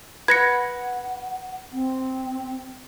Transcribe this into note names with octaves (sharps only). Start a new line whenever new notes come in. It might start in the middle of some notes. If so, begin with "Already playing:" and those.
B4 F#5 G#6 A#6 C#7
C4